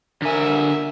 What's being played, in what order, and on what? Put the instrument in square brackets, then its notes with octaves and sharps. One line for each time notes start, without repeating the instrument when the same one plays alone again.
[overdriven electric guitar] D3 G#5 [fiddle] A#4 E5